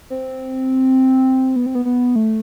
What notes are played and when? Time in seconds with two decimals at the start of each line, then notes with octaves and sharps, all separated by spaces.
0.10 C4
1.56 B3
1.66 C4
1.75 B3
1.85 B3
2.16 A3